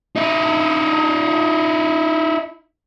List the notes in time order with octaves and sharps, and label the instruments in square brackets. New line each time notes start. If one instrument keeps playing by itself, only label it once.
[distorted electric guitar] D#4 E4